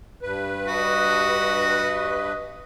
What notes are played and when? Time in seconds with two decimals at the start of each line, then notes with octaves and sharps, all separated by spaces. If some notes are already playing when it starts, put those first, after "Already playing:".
0.22 G2 B4
0.68 F#4 D#5